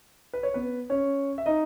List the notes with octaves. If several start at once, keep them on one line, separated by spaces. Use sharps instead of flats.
B4
C#5
B3 B4
C#4 C#5
E5
D#4 D#5